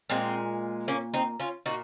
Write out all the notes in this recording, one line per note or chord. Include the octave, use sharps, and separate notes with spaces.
A#2 G#3 C4
A#3 C#4
C4 D#4
C#4 F4
A#2 D#4 F#4